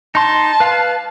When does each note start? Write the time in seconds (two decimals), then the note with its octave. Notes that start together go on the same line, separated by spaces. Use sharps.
0.15 D#4 A5 C6
0.60 B4 F5